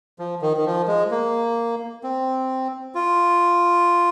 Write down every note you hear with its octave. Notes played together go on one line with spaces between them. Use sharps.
F3
D#3
D#3
F3
G#3
A#3
C4
F4